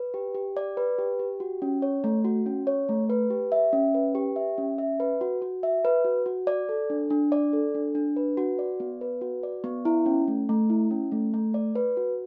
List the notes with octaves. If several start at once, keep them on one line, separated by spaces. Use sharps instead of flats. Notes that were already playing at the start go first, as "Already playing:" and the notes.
Already playing: B4
G4
G4
D5
B4
G4
G4
F#4
C#4
C#5
A3
F#4
C#4
C#5
A3
B4
G4
E5
C#4
B4
G4
E5
C#4
E5
B4
F#4
F#4
E5
B4
F#4
F#4
D5
A4
D4
D4
D5
A4
D4
D4
B4
F#4
D5
B3
B4
F#4
D5
B3
E4
C#4
A3
A3
E4
C#4
A3
A3
D5
B4
F#4